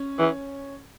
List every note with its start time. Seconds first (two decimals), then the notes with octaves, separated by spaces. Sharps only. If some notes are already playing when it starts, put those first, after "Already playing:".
Already playing: C#4
0.19 E3